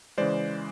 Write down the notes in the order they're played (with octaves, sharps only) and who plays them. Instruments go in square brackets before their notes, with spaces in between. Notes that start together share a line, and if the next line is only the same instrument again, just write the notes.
[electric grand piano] C#3 E3 G#3 C5 D5